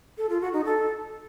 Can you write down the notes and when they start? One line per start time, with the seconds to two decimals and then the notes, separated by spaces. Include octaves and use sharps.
0.18 A4
0.29 F4
0.41 F#4
0.53 D#4
0.65 A4